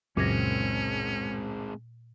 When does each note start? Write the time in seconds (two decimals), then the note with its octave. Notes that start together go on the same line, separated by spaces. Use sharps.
0.17 C#2 F#2 A#2 G#3 C4 C#4 G#6 A#6